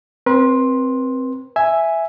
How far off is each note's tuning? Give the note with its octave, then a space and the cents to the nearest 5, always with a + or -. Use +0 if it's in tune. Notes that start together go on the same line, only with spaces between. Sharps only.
C4 +0 B4 -35 C6 +10
E5 +0 G#5 +0